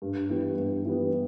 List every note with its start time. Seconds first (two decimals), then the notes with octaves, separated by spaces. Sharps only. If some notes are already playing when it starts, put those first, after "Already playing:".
0.02 G2
0.30 E3 G3 B3
0.57 G2
0.85 E3 G3 B3